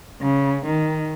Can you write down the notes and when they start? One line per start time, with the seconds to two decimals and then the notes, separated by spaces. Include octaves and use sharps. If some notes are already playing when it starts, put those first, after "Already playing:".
0.21 C#3
0.66 D#3